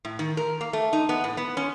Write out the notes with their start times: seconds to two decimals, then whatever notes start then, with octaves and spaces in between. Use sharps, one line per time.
0.05 A2
0.19 D#3
0.37 A#4
0.61 A#3
0.73 A3
0.93 D#4
1.09 B3
1.24 A2
1.37 B3
1.57 C#4